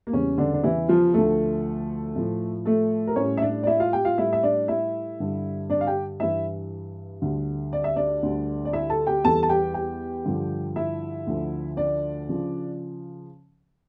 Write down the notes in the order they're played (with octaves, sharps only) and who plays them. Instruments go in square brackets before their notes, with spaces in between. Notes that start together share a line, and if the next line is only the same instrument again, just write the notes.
[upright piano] A#3
E2 C#3 G3 C#4
D3 D4
D4
E3 E4
F3 F4
D2 D3 F3 A3 A4
A2 F3
A3 A4
A#4
A2 G3 C#4 C#5
E5
D4 D5
D5
E4 E5
F4 F5
G4 G5
F4 F5
A2 G3 E4 E5
E5
D4 D5
E4 E5
G2 D3 G3
D4 D5
F5
G4 G5
G2 E3 G3 E4 E5
D2 D3 G3
D5
E5
D4 D5
D2 D3 G3
D5
E4 E5
A4 A5
G4 G5
E2 E3 G3 A4 A5
A5
G4 G5
G4 G5
G2 D3 F3
E4 E5
D2 D3 F3
D4 D5
C#3 F3